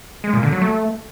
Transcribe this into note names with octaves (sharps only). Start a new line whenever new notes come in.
G#3
A#2
D3
F#3
A3